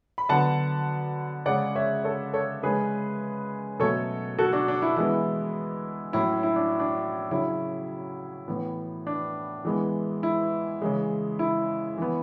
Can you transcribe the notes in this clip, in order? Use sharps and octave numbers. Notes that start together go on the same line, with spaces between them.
B5
D3 F#3 B3 F#5 A5
C#3 G#3 C#4 D5 F#5
C#5 E5
A4 C#5
A4 C#5
C#3 G#3 C#4 G#4 B4
B2 F#3 A3 C#4 A4 C#5
F#4 A4
D4 F#4
D4
E4
E3 G#3 B3 E4
A2 F#3 C#4 E4
E4
D4
D4
C#3 F#3 C#4 E4
A2 E3 B3
D4
E3 G#3 B3
E4
C#3 E3 G#3
E4
E3 B3